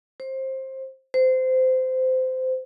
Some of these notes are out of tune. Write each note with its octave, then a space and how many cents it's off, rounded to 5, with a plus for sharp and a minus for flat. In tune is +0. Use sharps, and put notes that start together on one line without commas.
C5 +20
C5 -20